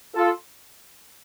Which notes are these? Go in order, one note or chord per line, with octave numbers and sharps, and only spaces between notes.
F4 A4